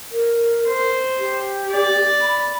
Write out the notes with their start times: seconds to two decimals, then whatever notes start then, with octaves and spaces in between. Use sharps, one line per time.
0.12 A#4
0.68 C5
1.19 G4
1.72 D5
2.22 B5